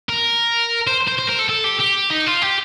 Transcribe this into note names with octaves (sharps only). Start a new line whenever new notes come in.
A#4
C5
C5
C5
A#4
A4
A4
G4
G4
D#4
F4
G4